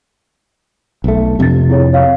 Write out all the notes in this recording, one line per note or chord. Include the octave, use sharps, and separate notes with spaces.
B1 A3
F2 C3 D4 A6
E4 G#4 C#5
C#5 F5